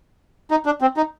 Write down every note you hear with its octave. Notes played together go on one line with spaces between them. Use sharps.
D#4
D4
C4
D#4